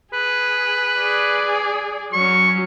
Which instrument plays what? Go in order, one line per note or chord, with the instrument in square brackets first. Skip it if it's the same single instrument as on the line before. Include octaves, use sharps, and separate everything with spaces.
[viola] G#4 [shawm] B4
[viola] G#4 D5
[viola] F#3 C#4 [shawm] C#6